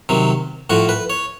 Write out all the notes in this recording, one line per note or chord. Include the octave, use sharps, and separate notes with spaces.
C3 D#3 F#3
A2 F3 F#4
B4
C#5